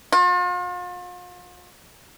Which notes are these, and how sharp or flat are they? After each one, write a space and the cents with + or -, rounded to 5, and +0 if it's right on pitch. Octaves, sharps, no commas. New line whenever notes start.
F4 +40